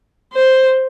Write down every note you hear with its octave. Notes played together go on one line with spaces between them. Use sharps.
C5